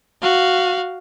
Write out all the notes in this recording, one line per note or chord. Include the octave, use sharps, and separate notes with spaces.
F#4 F5